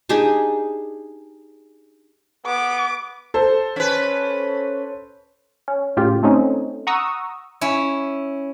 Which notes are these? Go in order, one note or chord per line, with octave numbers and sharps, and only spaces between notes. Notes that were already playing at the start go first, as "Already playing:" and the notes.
D4 D#4 G4 G#4
B3 D6
A4 C5
C#4 B4
C#4
A2 C#3 F4 G4
A3 C4 C#4 D#4
F#5 A#5 C#6 D#6 E6
C#4 E4